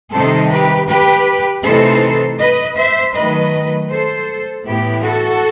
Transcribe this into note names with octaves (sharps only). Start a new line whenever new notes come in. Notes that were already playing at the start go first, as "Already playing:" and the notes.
C3 D#3 G3 C4 D#4 A4 C5
G4 B4
G4 B4
C3 E3 A3 D#4 A4 C5
B4 D#5
C5 E5
D#3 F#3 A3 B4 D#5
A4 C5
A2 E3 B3 E4 G4
F#4 A4